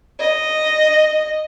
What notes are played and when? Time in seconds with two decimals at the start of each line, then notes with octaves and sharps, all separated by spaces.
0.20 D#5